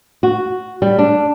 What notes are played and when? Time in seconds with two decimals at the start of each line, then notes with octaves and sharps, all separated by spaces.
0.23 F#4
0.82 G3
0.99 D4